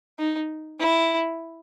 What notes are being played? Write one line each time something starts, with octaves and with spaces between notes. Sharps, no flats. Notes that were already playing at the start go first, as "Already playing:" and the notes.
D#4
E4